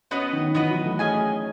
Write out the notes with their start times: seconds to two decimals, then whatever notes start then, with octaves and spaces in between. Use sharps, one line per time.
0.11 B3 C#4 F#4 B4 D#5
0.33 D#3
0.55 E3 B3 F#4 B4 D#5
0.70 F#3
0.85 A3
0.99 C#4 G#4 D#5 G#5